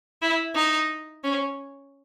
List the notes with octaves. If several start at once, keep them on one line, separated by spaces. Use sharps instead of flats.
E4
D#4
C#4